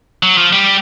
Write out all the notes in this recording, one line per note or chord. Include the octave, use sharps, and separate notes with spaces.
F#3
F3
G3